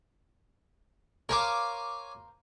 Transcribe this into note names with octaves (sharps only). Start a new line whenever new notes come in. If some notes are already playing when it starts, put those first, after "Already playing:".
A#4 C5 C#5 F5 G#5 D6